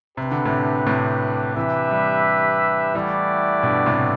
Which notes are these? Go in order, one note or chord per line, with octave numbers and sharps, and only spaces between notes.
C3 D4 G4 B4
D3
A2 C3
A2 C3
C3 E3 D4 G4 B4 E5
E3 G3
E3 G3 A3 E4 G4 D5 F#5
G2 B2
A2 C3